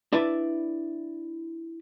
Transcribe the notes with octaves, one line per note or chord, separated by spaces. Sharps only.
D4 E4 B4 D5 E5